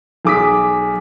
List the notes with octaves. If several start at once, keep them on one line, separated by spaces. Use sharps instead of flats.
B1 G#4 D6 D#6 B6